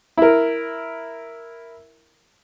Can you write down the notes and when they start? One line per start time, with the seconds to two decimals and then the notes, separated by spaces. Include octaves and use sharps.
0.18 E4 A#4